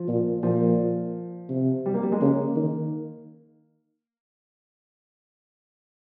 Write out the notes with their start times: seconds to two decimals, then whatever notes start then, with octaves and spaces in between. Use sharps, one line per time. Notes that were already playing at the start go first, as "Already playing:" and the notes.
Already playing: F3
0.08 A#2
0.43 A#2 F3
1.49 C3
1.86 G3
1.94 A#3
2.03 G3
2.12 G#3
2.21 C#3 A#3
2.56 D#3